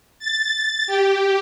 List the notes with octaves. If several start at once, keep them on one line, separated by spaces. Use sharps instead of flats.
A6
G4